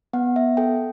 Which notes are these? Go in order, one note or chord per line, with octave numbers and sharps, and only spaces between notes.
B3 F#5
E5
A4 G5